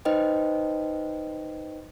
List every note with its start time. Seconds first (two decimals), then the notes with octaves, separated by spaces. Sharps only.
0.05 D#4 B4 C5 D#5 G5